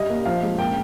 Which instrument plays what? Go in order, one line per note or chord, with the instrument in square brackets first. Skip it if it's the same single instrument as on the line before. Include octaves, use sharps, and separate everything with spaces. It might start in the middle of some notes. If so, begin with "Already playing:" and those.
Already playing: [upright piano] G3 D#5
A#3
F3 F5
G#3
A#3 G5